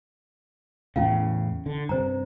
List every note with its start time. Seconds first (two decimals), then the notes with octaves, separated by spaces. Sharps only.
0.96 E2 A2 C#3 C#4 E4 F5
1.66 D3
1.89 G2 C3 C5 A#5